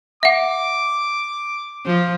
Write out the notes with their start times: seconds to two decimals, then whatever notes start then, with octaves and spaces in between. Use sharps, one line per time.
0.23 E5 F#5 D6
1.86 F3